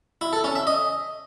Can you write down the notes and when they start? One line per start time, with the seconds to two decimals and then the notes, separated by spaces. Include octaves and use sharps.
0.21 E4
0.33 A4
0.44 C#4
0.55 E5
0.67 D#5